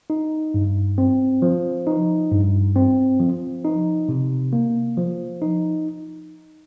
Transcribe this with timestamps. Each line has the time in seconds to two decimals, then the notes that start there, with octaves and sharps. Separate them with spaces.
0.10 D#4
0.54 G2
0.98 C4
1.42 F3
1.87 D#4
2.31 G2
2.76 C4
3.20 F3
3.64 D#4
4.09 C3
4.53 A#3
4.98 F3
5.42 D#4